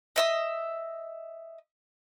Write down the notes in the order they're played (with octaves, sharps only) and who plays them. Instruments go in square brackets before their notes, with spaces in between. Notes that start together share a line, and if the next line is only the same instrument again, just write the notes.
[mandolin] D#5 E5 D#6